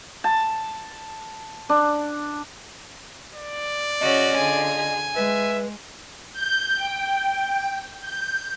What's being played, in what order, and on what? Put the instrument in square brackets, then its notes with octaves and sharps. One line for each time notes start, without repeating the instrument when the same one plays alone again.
[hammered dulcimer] A5
D4
[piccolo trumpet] D5
[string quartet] C#3 [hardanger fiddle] C#4 F#4 [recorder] D#5
[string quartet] D3 F4 G#4 [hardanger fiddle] G#5
[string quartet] G#3 [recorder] B4 [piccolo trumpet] E5
[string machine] G6
G5
G6